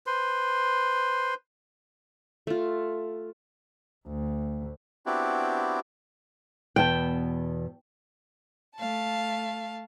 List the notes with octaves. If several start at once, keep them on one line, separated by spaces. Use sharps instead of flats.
B4 C5 C6
A3 F4
D2
B3 C4 D4 E4 F#4 G4
E2 B2 G5 A5
A3 F5 A5